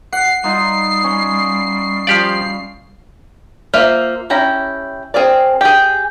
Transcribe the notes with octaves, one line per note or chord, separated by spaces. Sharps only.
F#5 C7
G3 D#4 F4 D#5
C#4
F3 G3 G4 D5 F5
A#3 F4 C5 E5
C#4 E4 G4 A#5
C4 G#4 A#4 D5
G4 G#4